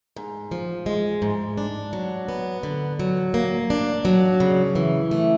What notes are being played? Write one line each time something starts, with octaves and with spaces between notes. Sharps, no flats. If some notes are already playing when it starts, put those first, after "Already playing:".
G#2
F3
G#3
G#2
D4
F#3
B3
D3
F#3
A#3
D4
F#3
C#3
E3
A3